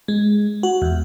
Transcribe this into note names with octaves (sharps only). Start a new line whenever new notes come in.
G#3
F#4
E2